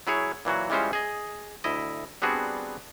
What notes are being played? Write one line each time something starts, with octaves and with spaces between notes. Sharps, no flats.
F#3 E4 G#4 C#5
A#2 E3 F#3 F#4
E3 G3 G#3 C#4 F4 C5
G#4 D#5
D2 E4 D#5
G3 B3 C4 D4 F#4 G#4